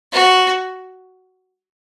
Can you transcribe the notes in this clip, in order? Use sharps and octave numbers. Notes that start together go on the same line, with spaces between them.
F#4